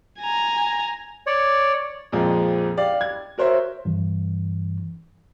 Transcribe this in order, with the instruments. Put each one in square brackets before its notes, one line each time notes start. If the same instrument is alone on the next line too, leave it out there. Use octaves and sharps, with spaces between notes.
[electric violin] G#5 A#5
[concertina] C#5 D5
[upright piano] F2 A#2 F3 G#3 C4
G4 D5 F5
G#6
F#4 A#4 C5 C#5 E5
[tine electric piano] G2 E3